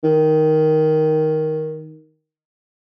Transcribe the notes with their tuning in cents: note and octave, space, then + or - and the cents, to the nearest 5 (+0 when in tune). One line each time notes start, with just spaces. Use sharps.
D#3 +5